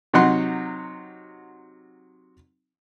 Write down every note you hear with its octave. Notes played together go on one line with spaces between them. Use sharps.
C3 F#3 D#4 F#5 C6